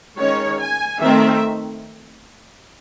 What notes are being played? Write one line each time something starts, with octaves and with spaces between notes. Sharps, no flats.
D#3 G#3 C#4 C#5
G#5
D#3 A3 C4 E5